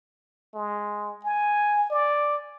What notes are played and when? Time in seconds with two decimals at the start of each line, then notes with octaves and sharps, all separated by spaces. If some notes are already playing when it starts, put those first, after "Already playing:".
0.54 G#3
1.25 G#5
1.90 D5